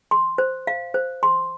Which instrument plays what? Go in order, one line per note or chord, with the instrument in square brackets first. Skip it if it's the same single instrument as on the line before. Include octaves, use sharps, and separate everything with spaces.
[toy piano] C6
C5
F5
C5
C6